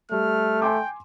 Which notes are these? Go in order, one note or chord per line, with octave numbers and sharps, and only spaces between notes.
G3 A3 F6
G5 G#5 C6 D6